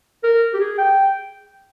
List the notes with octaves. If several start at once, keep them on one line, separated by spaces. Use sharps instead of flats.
A#4
G4
G#4
G5